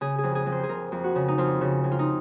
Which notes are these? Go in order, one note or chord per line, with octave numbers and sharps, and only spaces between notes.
C#3 G#4
G#4
F2
G#4
F2
C5
G#4
F2 A#4
F2
F#4
C#3
D#4
F2 F4
C#3
F2
F4
D#4